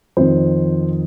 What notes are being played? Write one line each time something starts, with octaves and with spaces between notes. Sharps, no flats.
F2 D#3 C5